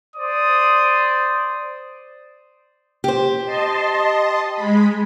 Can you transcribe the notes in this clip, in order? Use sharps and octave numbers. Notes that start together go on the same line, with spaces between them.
C5 D5 D#6
G4 C5
D#5 A5 C6
G#3 B5